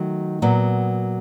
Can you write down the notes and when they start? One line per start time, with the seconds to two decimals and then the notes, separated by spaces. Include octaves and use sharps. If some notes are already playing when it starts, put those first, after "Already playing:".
Already playing: D#3 F#3 A3
0.42 A#2 F#3 B3